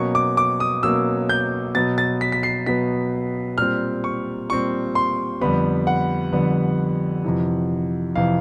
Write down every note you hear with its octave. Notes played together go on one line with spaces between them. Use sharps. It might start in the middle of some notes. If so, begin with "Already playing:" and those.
Already playing: B2 F#3 A#3 C#4 C#6
D6
D6
D#6
B2 F#3 A#3 C#4 E6
G6
B2 F#3 B3 A6
A6
B6
B6
C7
B2 F#3 B3 B6
A#2 G3 C4 F6
C#6
A#2 G3 C4 C#6
C6
F2 D3 G3 B3 B5
F#5
F2 D3 G3 B3
F2 C3 E3
F2 C3 E3 F5